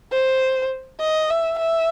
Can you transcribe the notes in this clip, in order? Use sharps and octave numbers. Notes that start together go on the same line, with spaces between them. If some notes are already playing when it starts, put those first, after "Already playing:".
C5
D#5
E5
E5